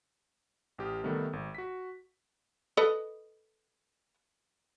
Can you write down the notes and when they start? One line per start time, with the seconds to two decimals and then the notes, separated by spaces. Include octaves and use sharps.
0.78 A1 G4 D#6 F6
1.04 C3 D#3 G3 A3 B3 A4
1.33 G#1
1.55 F#4 B6
2.77 A4 B4 D#5